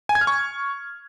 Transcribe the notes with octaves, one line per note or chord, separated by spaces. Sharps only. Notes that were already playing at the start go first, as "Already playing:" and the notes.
G#5
G#6
F6
C#6